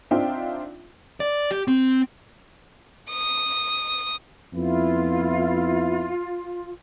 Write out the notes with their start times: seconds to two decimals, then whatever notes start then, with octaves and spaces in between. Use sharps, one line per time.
0.11 C4 D4 D#4 F4 E5 G5
1.20 D5
1.51 G4
1.68 C4
3.09 D#6
4.54 F2 B3 E4 F4